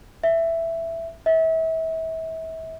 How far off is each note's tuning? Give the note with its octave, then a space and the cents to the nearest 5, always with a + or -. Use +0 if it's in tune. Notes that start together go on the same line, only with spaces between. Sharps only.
E5 +5
E5 -30